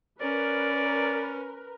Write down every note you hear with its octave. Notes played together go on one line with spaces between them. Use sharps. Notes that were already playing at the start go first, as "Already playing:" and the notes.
C#4 A#4 B4 D5